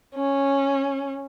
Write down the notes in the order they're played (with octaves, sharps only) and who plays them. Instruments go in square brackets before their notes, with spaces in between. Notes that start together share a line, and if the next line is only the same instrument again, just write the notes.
[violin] C#4